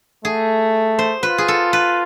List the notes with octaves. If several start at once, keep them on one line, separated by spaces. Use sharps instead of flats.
A3 G#4
C5
F4 B4
G#4
A4
B4